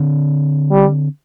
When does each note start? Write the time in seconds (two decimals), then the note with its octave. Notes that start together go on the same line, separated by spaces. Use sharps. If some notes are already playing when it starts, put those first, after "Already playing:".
Already playing: D3 C4
0.71 G3